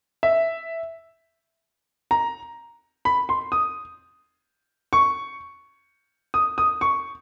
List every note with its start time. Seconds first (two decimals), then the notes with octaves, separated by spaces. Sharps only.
0.23 E5
2.11 A#5
3.05 B5
3.29 C6
3.52 D#6
4.93 C#6
6.34 D#6
6.58 D#6
6.81 C#6